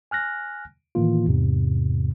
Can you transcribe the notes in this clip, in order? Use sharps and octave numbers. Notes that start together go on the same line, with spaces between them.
G#5 F6 F#6 A#6
A2 D#3 E3 A#3 F4
E2 G#2 C3